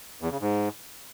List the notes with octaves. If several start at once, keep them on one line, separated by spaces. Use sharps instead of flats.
E2
C#3
G#2